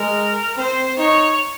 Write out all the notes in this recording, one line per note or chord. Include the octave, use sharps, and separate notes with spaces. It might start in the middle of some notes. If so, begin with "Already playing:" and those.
Already playing: G#3 A#4
C4 C5
D#4 C#5